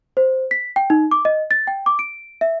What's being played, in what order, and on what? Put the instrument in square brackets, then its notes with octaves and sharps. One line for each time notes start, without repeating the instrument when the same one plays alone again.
[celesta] C5
B6
G5
D#4
D6
D#5
A6
G5
D6
D7
E5